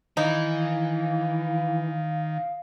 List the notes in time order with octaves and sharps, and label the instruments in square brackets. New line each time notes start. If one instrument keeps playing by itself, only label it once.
[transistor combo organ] D#3 [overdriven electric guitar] E3 [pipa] D#4 [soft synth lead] F5